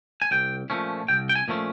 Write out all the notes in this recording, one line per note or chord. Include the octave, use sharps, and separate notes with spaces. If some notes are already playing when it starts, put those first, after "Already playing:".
G#5
C2 G5
A#2 F3 A3 C#4
C2 G5
G5
G#5
A#2 F3 A3 C#4